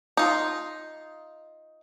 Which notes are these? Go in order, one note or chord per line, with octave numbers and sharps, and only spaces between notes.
D#4 F4